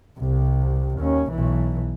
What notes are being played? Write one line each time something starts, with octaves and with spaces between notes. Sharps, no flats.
C2 C3
D#2 C#4
B1 E3